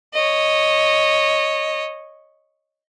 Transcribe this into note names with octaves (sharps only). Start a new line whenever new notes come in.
C#5 D#5